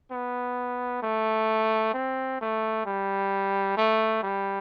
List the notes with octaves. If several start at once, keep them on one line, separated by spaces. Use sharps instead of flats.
B3
A3
C4
A3
G3
A3
G3